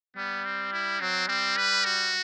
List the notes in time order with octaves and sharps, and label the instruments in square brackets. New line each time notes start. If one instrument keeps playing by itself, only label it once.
[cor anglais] G3 [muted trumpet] B3
[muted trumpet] C4
E4
[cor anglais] F#3 [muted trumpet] C4
[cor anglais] G3 [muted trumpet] C4
[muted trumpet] B4
F#4